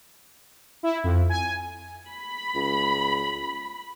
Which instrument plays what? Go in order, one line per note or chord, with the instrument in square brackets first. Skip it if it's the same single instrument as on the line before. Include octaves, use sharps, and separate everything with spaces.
[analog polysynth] E4
F2
G#5
[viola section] B5
[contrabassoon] C#2